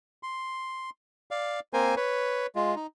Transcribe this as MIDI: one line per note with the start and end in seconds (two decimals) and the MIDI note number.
0.23 0.90 84
1.31 1.60 74
1.31 1.60 77
1.73 1.95 58
1.73 1.95 60
1.73 1.95 70
1.73 1.95 72
1.73 1.95 80
1.96 2.47 71
1.96 2.47 73
2.55 2.75 56
2.55 2.75 65
2.76 2.87 63